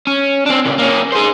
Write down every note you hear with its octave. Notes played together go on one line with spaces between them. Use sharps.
C#4
C4 D4
A#2 C#3
A#3 C#4
G#4 C5